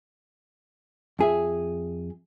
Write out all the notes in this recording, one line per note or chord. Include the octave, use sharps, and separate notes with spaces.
F2 G#4 E5